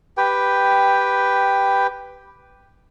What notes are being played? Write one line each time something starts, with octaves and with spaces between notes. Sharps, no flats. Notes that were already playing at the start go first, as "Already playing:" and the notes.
G4 B4 G5